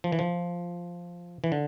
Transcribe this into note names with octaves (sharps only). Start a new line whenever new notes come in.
F3
E3
F3
E3
D3